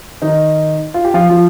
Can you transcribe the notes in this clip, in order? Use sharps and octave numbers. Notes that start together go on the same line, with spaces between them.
D#3 D#4
F4
G4
F3 F4
F3 F4